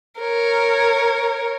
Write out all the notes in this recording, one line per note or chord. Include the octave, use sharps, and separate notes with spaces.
A#4 C#5